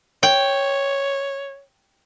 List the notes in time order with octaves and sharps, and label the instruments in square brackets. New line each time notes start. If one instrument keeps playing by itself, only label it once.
[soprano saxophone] C#5 [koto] G5